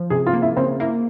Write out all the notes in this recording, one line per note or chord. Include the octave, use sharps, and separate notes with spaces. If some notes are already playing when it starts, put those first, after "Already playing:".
Already playing: F3
C3 G#4
F4
A#3
E4
C#3 C4
A#3 E4